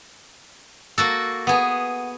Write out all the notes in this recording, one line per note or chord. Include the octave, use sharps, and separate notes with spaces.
A#3 F#4 A4
A6
B3 G#4 F#5